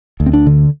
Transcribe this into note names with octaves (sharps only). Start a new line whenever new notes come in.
D2
C4
D4
D3